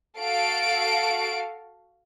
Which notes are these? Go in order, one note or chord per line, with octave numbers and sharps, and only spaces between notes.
F#4 A4 F5 D7